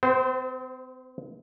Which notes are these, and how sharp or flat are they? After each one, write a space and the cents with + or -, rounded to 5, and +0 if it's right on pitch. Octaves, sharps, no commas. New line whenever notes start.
C4 -40 C5 +0